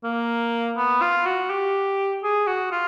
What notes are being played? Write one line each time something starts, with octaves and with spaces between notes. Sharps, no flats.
A#3
B3
F4
F#4
G4
G#4
F#4
F4